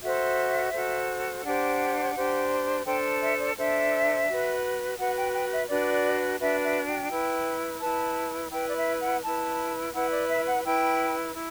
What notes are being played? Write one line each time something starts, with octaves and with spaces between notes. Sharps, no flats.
F#4 A4 C5 E5
F#4 A4 C5
D4 G4 C5 F#5
D4 G4 C5
D4 A4 C5 G5
E5
D5
D4 A4 C5 E5
F#4 B4
F#4 B4 F#5
G5
G5
E5
D4 F#4 B4 D5
D4 F#4 B4 E5
E5
G5
E4 B4
E4 B4 A5
E4 B4 G5
D5
E5
F#5
E4 B4 A5
E4 B4 F#5
D5
E5
F#5
E4 B4 G5
E4